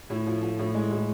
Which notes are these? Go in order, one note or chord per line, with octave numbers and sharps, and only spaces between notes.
A2
F3
F3
A2
G#3
A2